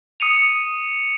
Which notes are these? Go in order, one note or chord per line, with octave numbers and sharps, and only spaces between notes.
D#6 C#7 D#7 F7